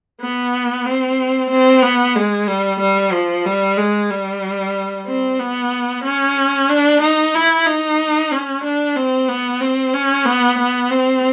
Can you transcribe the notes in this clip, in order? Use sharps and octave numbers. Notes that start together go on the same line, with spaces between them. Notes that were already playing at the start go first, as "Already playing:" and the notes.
B3
C4
C4
B3
G#3
G3
G3
F3
G3
G#3
G3
C4
B3
C#4
D4
D#4
E4
D#4
C#4
D4
C4
B3
C4
C#4
B3
B3
C4